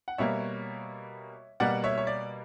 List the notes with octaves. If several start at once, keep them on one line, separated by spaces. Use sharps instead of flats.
F#5
B2 G3 A#3 C#5 E5
B2 G3 A#3 D5 F#5
C#5 E5
C#5
D5